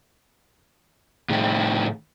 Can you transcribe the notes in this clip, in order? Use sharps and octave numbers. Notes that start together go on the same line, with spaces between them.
A2 D#3